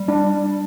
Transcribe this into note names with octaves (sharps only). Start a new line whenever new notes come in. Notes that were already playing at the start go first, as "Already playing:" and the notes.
Already playing: G3
D4